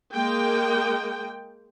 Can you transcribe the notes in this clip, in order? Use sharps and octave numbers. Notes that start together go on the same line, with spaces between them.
G#3 A#3 G5